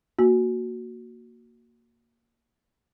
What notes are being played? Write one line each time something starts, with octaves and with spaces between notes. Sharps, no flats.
A#3 F#4